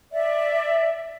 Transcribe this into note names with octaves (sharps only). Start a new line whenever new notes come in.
D5 E5